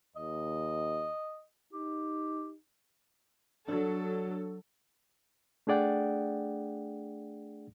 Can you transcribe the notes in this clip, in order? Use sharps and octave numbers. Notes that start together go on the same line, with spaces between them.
D#2 D#5
D#4 G4
F#3 D4 A4
A3 D4 G#4 D5 F#5 G5